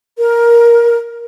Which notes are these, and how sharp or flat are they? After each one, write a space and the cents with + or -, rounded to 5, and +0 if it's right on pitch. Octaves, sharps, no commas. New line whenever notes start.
A#4 +10